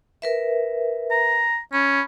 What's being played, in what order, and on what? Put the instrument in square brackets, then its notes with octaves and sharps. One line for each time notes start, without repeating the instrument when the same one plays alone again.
[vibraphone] A#4 B4 E5
[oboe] A#5
[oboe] C#4 [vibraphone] B5